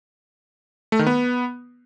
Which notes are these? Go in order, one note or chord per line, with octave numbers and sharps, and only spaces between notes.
A3
D#3
B3